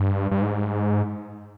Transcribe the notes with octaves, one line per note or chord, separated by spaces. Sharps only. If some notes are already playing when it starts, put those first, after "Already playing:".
Already playing: G2
G2
G#2